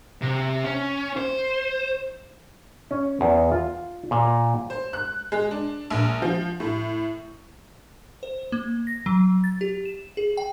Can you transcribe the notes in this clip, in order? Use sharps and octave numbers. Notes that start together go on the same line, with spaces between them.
C3
C#4
C5
C#4
E2
F4
A#2
C5
F#6
G#3
D4
A#1
F3
A2
C5
A#3
A#6
F#3
A6
G4
E7
G#4
G5